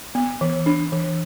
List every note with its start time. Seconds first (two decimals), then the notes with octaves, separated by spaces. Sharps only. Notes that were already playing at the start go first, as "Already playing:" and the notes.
0.15 B3
0.41 E3
0.66 D4
0.92 E3